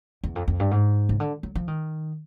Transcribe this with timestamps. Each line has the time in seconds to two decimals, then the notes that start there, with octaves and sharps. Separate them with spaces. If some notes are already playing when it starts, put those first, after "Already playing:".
0.24 E2
0.36 F2
0.48 F2
0.60 G2
0.71 G#2
1.09 C#3
1.20 D3
1.43 F#3
1.55 F3
1.68 D#3